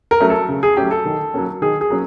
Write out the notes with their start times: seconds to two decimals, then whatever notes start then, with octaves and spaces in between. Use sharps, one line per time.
0.11 A#4
0.20 F#3 A3 C#4
0.30 A4
0.49 C#3
0.63 G#4
0.77 F#3 A3 C#4 G4
0.91 A4
1.05 D#3
1.34 F#3 A#3 C#4
1.62 D#3 G#4
1.81 G#4
1.90 F#3 A#3 C#4